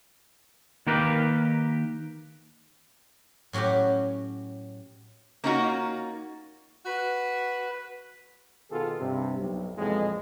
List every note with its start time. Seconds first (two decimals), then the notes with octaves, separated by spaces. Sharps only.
0.87 D#3 A#3 G4 A#4 B4
3.53 A2 F#3 C#4 F#4 G4
5.44 A#3 C#4 D#4 F4 F#4
6.85 F#4 B4
8.71 B2 D#3 B3 F4 G#4 A4
8.99 G2 C3
9.38 B1
9.75 B1 F2 A#2 E3 G#3